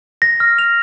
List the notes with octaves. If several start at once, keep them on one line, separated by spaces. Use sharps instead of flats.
A#6
F6
F7